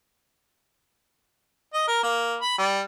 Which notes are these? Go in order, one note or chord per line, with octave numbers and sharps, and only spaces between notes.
D#5
A#4
A#3
B5
G3